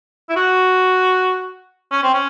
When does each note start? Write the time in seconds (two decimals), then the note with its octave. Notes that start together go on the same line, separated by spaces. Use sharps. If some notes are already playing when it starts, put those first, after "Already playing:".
0.29 E4
0.36 F#4
1.91 C#4
2.03 C4
2.14 C#4